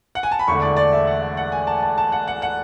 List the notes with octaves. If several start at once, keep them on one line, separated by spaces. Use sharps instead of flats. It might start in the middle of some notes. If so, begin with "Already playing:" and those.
F#5
G#5
A5
B5
E1 E2 D3 A3 C#6
D5
D5
E5
F#5
E5
F#5
G#5
A5
A5
A5
F#5
F#5
F#5